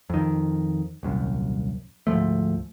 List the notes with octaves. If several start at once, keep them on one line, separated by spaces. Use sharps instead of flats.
F2 D#3
D#1 C2 F#2
D2 G#2 F3 A3